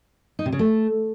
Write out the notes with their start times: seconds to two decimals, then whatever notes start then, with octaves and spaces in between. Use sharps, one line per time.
0.39 D#4
0.46 C3
0.52 C#3
0.59 A3